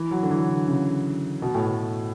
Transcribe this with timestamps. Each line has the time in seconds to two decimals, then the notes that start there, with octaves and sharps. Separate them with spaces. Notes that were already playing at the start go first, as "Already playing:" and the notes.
Already playing: E3
0.11 F#3
0.23 D3
0.31 E3
0.49 D3
0.68 C#3
1.42 B2
1.55 A2
1.67 B2